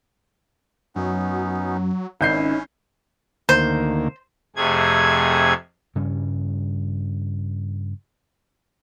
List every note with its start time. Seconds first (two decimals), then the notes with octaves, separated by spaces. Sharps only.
0.96 F#2 F#3 B3 C#4 D#4
2.21 G#1 C#4 D#4 E4 G6 C7
3.49 D2 D#3 A#3 C5
4.56 F2 C3 A3 G#4 G#6
5.95 G2 C#3 G3 C#4